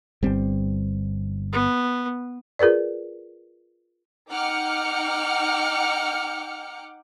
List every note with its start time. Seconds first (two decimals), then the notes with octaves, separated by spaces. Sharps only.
0.23 D1 G1 G3 C4
1.53 B3
2.59 F4 G#4 A#4 B4 D5
4.30 D#4 F#5 G5 D6 F6 C#7